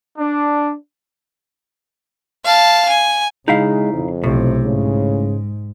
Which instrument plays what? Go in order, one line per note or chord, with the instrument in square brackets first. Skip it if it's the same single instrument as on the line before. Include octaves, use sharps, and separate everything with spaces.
[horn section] D4
[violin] F5 A5
G#5
[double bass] C#3 [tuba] G#3 [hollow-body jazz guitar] D#4 E4 F5
[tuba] F2
[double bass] B1 C3 [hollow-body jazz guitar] A2
[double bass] G#2 [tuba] C#3